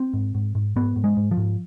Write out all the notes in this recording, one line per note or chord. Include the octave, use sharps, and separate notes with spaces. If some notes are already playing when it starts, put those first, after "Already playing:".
Already playing: C4
G#2
G#2
G#2
G#2 B3
G#2
G#3
G#2
F3
G#2